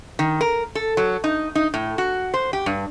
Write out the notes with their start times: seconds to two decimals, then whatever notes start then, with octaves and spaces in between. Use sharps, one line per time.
0.19 D#3
0.41 A#4
0.75 A4
0.97 F#3
1.24 D#4
1.55 D#4
1.74 A2
1.98 F#4
2.34 C5
2.53 G4
2.66 G2